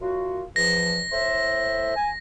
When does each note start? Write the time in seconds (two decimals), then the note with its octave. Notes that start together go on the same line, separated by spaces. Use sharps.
0.01 F#2 F4 F#4
0.56 E2 F3 A#6
1.12 A2 C5 E5
1.96 G#5